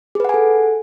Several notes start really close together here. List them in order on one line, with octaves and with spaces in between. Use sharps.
G#4 B4 F#5 G#5 A4